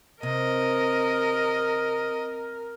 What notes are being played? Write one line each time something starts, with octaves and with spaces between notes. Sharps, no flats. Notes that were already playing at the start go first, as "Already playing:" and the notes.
C3 A#4 D#5